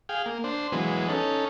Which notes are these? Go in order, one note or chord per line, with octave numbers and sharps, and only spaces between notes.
G#4 F5 G5
A#3
D4 C5
E3 F#3 G#3 B3
C#4 D#4 A4